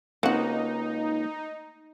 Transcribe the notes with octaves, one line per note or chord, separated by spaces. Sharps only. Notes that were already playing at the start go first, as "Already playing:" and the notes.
C#2 A#3 C4 D#4 F#4 F#5